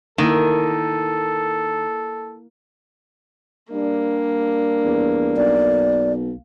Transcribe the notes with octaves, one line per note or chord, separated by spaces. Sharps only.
D#3 A#3 E4 A4
G3 A#3 D4
E2
B1 D5